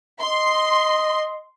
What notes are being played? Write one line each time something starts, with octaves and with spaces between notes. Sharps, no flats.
D#5 C6